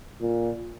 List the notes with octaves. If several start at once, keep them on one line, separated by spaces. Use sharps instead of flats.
A#2